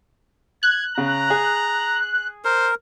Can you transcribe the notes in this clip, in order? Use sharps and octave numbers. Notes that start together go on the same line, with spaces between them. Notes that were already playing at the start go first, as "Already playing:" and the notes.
F#6 G#6
C#3 A#5
G#4
A#4 C5